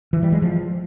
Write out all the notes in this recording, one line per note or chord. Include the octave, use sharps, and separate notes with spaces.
E3
G3
G#3
F3